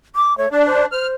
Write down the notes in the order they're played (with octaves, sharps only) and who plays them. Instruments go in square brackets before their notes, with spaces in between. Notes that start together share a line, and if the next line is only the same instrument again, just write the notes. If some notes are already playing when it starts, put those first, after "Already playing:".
[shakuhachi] D6
[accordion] A3 [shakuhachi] C#5
[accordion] D4 [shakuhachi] D5
[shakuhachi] C5
[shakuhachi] C5 [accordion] F6